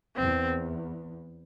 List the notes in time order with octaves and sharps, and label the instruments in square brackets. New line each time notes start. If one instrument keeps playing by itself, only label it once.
[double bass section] E2 [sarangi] C4